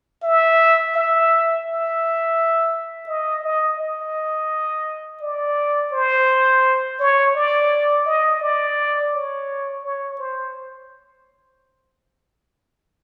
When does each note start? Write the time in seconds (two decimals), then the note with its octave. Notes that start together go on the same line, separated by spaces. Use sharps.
0.23 E5
0.95 E5
1.66 E5
3.08 D#5
3.44 D#5
3.79 D#5
5.22 D5
5.92 C5
6.99 C#5
7.35 D5
8.06 D#5
8.41 D5
9.12 C#5
9.83 C#5
10.19 C5